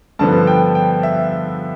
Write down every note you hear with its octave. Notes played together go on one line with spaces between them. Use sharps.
G2 D3 F3 B3 A5
G5
G5
E5